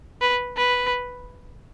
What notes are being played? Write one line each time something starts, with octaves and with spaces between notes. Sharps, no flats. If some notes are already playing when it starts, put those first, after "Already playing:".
B4
B4